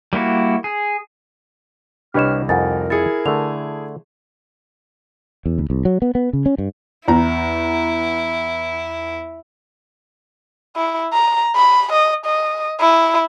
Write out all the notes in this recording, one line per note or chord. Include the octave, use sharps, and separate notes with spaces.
G3 A#3 E4 F#4
G#4
C2 D4 G4 B4 C#5 D#5 F6 E7
F2 D#4 A#4 F#5 G#5 A6
E4 G#4 A6 C#7
D3 A3 F7
E2
D2
C2
F#3
B3
B3
C#3
C#4
G2
E2 E4 A#5
E4
A#5
B5
D#5
D#5
E4